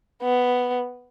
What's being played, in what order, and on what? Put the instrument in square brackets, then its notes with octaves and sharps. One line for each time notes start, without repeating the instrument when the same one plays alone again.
[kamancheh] B3